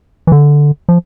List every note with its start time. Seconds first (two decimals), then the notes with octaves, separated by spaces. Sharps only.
0.27 E3
0.32 D3
0.89 F3